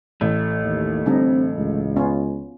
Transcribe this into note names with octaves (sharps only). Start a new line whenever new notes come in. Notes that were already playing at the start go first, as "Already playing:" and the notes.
A1 A3
D#2
D3 G3 C4 D#4
C#2
B3 C#4 F4